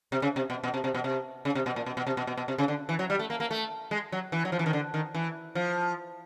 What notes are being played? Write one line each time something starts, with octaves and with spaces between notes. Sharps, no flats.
C3
C#3
C3
B2
B2
C3
C3
B2
C3
C#3
C3
B2
A#2
B2
B2
C3
B2
B2
B2
C3
C#3
D3
E3
F#3
G3
A3
A#3
A#3
A3
G#3
F#3
E3
F#3
F3
E3
D#3
D3
D#3
E3
F3